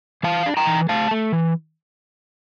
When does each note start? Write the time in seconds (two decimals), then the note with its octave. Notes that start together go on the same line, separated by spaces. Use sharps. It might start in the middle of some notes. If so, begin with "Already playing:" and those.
0.23 E3 F5 A5
0.46 D4
0.57 G5 A#5
0.67 E3
0.89 A3 F5 A5
1.11 A3
1.33 E3